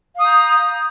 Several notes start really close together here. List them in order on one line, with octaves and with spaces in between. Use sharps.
F5 D#6 A#5 G6